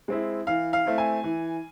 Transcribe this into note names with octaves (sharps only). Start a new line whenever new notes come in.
G#3 C4 E4
E3 F5
F5
A3 C4 E4
G#5
E3